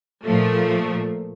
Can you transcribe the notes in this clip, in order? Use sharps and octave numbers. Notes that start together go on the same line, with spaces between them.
A#2 F3 A3